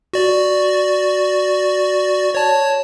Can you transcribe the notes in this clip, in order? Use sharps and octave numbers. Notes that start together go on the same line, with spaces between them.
F#4 D5
C#5 A5